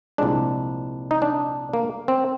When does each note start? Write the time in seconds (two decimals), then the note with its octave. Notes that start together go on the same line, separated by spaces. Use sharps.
0.18 C2 A#2 F3 G#3 D4
1.11 D#4
1.22 D4
1.74 A#3
2.08 C4